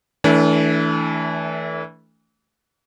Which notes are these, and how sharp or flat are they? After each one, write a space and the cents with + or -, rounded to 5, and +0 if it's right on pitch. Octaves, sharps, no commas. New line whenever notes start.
E3 -25 A3 +0 D4 -45